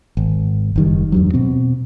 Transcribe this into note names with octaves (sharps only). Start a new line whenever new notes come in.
G#1
F#1 D#3 G3
E2 G2 F#3
B2 C4